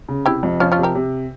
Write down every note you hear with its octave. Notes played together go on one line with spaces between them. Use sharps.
C#3
C3 E4 G4
F2
F3 C#4 F4
C#4 F4
C3
G4 A#4
C3